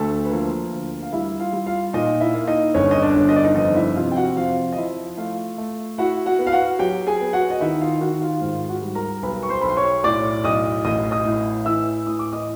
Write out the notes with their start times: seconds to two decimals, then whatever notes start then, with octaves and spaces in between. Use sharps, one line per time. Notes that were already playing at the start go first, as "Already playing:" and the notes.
Already playing: D2 A3 A4
0.25 B4
0.32 F3 A#3 A#4
0.73 D2
1.02 F5
1.12 G3 E4 E5
1.39 F4 F5
1.53 G3
1.66 F4 F5
1.93 A#2 D#4 D#5
2.20 E4 E5
2.34 A#3
2.47 D#4 D#5
2.74 G1 C#4 C#5
2.91 D#5
3.02 D4 D5
3.16 G1
3.29 D#5
3.36 D5
3.44 D#4 D#5
3.55 F2 D#4 D#5
3.75 E4 E5
3.96 C3 F4 F5
4.12 G5
4.16 F#4 F#5
4.36 F2 F4 F5
4.72 D#5
4.77 F3 E4 E5
5.17 A3 F4 F5
5.58 A3
5.98 E4 F#4 F#5
6.26 F#4 F#5
6.39 B3
6.47 F5
6.52 F#4 F#5
6.79 F#3 G4 G5
7.07 G#4 G#5
7.20 B3
7.33 F#4 F#5
7.50 D#5
7.61 D#3 E4 E5
7.81 F4 F5
8.01 D#3 F#4 F#5
8.21 F4 F5
8.41 G#2 F4 F5
8.69 F#4 F#5
8.82 G3
8.95 A#4 A#5
9.23 B1 B4 B5
9.43 C#6
9.49 C5 C6
9.61 B1 B5
9.68 C6
9.77 C#5 C#6
10.03 A2 D5 D6
10.43 B1 D#5 D#6
10.85 A1 D#5 D#6
11.11 D#5 D#6
11.25 A2
11.65 E3 E5 E6
12.06 A2 D#6
12.19 D6
12.33 D#5 D#6